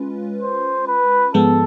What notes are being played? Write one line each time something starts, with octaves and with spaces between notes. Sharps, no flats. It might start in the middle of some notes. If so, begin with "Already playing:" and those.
Already playing: G#3 C#4 F4 B4
C5
B4
G#2 F3 G#3 B3 A4